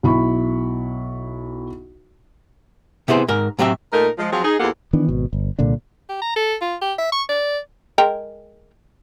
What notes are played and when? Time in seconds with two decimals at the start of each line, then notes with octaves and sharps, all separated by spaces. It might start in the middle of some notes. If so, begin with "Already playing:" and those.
0.03 B1 E4 B5 C#6
3.08 C3 B3 E4 G#4 C5
3.28 G#2 A#4
3.59 A2 F#3 C4 G4 E5
3.93 A#2 A3 D#4 A#4
4.19 F3 G#3
4.32 F3 F#3 C4 F4 F#4 G#4
4.44 D#4 G#4
4.59 E2 A#3 F4 G4 A4 F#5
4.93 D#3 E3 B3 D4
5.09 G#1 B2
5.33 G1
5.59 C2 A#2 D3 D4
6.09 G4
6.22 A#5
6.36 A4
6.61 F4
6.81 G4
6.98 E5
7.12 C#6
7.29 D5
7.98 G#3 A#4 G5